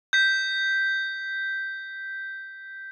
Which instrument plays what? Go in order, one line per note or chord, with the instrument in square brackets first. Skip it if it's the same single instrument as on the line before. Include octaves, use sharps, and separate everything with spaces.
[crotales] G6 B6